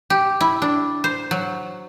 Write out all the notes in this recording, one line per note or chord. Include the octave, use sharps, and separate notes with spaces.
G4
E4
D4
C5
F#3